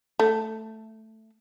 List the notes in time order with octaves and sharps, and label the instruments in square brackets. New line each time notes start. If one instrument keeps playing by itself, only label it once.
[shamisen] A3